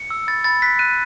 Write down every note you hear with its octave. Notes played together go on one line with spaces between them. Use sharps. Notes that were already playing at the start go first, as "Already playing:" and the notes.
Already playing: C#7
E6
B5 A6
B5 A6
F#6 B6
F#6 D#7